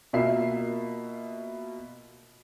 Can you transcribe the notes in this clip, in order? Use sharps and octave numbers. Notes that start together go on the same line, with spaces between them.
B2 A#3 F4 E5 C7